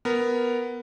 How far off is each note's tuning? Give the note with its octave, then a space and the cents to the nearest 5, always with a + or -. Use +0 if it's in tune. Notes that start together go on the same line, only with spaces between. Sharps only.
B3 +0 A#4 +0